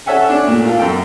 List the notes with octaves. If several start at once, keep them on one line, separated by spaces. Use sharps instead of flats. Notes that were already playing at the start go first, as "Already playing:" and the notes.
C#4 A4 E5 F#5 G#5
D4
A#2 A3
F4 A4
F#2 G5